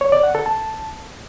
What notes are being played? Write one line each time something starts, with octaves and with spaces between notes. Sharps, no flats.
C#5
D5
F#5
A4
A5